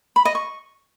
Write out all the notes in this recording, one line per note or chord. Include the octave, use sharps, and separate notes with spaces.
B5
D#5
C#6